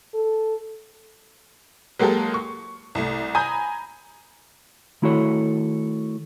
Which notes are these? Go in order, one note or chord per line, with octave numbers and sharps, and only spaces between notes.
A4
F#3 G#3 A#3 G4 A4 A#4
C#6
C2 A3
G#5 A#5 B5 D#6 G6
D#3 A3 E4 F#4 A4 C#5